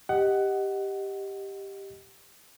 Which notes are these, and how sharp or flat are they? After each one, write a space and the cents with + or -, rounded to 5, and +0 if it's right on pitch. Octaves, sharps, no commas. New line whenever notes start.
G4 +0 D#5 +0 F#5 +15